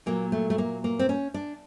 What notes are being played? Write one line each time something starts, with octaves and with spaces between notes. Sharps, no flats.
A#2 F#3 A#3
A3
A3
A#3
A#3
C4
C#4
D4